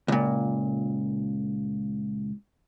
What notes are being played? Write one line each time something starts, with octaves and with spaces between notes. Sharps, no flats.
C#2 A#2